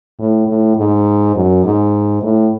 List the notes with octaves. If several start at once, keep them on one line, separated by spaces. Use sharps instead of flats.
A2
A2
G#2
F#2
G#2
A2